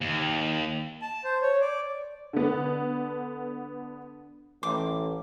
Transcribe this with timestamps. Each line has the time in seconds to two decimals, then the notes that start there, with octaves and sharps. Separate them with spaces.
0.01 D#2
1.02 A5
1.24 C5
1.41 C#5
1.61 D5
2.33 D3 B3
4.63 A1 D6